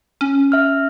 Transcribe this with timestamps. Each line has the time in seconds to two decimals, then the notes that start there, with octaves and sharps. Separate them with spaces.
0.21 C#4
0.52 E5 F6